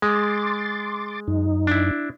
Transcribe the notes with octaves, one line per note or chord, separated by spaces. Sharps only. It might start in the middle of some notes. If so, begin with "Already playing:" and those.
G#3 C6 D6 A6
F#2 D#4
D4 E4